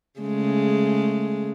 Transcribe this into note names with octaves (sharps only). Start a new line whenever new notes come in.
C#3 G#3 A3